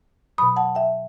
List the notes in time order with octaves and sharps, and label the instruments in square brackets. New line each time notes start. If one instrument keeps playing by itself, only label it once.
[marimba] B2 F#3 B5 D#6
F#5 A5
E5 G5